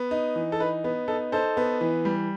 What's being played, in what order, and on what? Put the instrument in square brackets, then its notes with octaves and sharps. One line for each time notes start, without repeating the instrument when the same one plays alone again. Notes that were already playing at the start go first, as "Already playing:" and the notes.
Already playing: [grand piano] B3
D#4
E3
A4
D#4 B4
B3
D#4 A4
D#4 A4 C5
B3
E3
G3